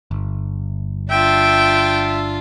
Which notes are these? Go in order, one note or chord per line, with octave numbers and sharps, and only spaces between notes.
G1
D4 F4 E5 G5